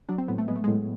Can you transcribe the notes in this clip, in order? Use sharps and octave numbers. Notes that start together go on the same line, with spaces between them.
F#3 D4
C4
A2 B3
A3
G#3 B3
A3
A2 G#3